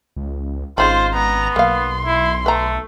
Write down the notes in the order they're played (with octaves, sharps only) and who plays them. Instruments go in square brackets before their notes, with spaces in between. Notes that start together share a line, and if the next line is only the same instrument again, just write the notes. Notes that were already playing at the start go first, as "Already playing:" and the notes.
[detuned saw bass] C#2
[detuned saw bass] G#1 [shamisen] C#3 D#4 B5 [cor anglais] F4 [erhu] C5
[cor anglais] B3 [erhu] A#5
[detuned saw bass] B1 [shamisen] A#3 F5 [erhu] C6
[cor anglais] E4
[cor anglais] A3 [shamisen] B4 A#5